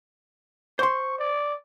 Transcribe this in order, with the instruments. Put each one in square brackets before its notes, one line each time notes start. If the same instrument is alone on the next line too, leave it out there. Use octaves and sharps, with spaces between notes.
[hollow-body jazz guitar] C5 C6 [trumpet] C#6
[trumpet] D5